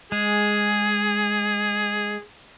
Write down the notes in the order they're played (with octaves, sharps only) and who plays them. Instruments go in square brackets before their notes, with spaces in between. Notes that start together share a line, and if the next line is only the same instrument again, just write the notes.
[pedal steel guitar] G#3 [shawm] G#4